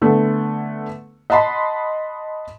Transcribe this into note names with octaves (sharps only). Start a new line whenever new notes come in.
D3 A3 B3
D#5 F#5 A5 B5 C6